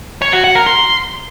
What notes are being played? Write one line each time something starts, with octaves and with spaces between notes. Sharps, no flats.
C#5
F#4
F#5
A#4
C6